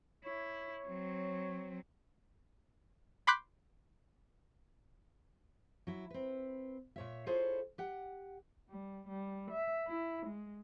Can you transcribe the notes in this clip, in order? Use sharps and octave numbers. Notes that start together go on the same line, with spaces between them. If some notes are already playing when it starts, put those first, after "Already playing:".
E4 C#5
F#3 C4
B5 C6 D6 F#6 G6 B6
F#3 E4
C4 B4
A#2 C#5 E5
E4 F4 G#4 A4 C5 C#5
G4 F#5
G3
G3
E5
E4
G#3